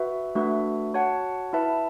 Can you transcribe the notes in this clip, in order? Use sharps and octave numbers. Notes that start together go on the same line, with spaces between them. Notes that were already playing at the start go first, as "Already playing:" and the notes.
Already playing: F#4 B4 E5
A3 D4 F#4 B4 E5
F#4 C#5 F#5 A5
E4 B4 E5 A5